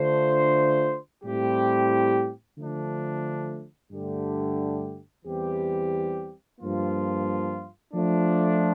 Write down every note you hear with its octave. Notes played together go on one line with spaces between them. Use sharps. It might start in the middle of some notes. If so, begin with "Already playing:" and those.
Already playing: D3 A3 D4 F4 C5
A2 G3 C4 E4 G4
D3 F3 A3 D4
G2 D3 A3 D4 G4
E2 E3 G3 C4 G4
G2 F3 A#3 F4
F3 A3 D4